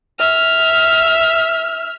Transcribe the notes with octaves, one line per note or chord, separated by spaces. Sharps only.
E5 F6